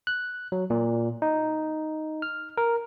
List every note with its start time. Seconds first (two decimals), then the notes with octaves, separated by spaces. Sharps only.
0.07 F#6
0.52 F#3
0.70 A#2
1.22 D#4
2.22 F6
2.58 A#4